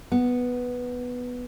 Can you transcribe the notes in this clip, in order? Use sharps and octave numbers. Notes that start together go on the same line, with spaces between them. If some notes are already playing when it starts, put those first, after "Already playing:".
B3